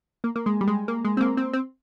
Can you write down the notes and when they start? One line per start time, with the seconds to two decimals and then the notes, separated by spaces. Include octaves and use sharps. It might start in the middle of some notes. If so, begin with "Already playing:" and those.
0.24 A#3
0.36 A#3
0.46 G#3
0.61 G3
0.68 G#3
0.88 A#3
1.05 G#3
1.17 C4
1.21 A#3
1.37 C4
1.53 C4